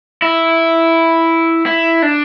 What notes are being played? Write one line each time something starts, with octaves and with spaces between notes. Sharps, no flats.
E4
E4
D4